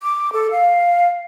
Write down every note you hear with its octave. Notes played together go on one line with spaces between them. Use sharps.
D6
A4
F5